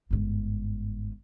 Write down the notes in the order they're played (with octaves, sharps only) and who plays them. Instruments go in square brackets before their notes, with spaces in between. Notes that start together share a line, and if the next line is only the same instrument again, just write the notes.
[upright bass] G1 G#2